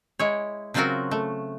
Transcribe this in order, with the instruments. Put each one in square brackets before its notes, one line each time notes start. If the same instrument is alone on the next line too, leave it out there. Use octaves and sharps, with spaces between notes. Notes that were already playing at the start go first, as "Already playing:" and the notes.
[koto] G#3 E4 C#5
C#3 F#3 C4 F4 F#4 A#4
A3